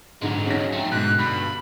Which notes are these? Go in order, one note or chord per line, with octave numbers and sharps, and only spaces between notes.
G#2 D3 F#3 G#3
C#4 D#4 A#6
A3 C4
G#2 B2 D3 F#6
G2 B5